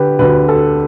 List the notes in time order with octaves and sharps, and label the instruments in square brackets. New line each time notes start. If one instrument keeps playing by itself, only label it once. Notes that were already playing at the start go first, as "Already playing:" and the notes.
Already playing: [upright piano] D3 G4 B4
D2 D3 B4
A4